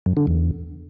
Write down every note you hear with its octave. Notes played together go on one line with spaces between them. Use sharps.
F#2
D3
E2